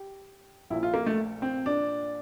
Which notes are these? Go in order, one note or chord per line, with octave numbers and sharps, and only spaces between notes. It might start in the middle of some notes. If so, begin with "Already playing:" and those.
Already playing: G4
A#1 A#2 E4
F4
A#3
A3
C4
D4